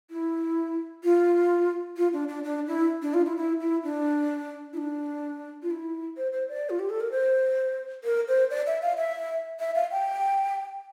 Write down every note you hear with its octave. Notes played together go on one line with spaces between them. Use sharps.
E4
F4
F4
D4
D4
D4
E4
D4
F4
E4
E4
E4
D4
E4
D4
F4
E4
C5
C5
D5
F4
G4
A4
A#4
C5
A#4
C5
D5
E5
F5
E5
E5
F5
G5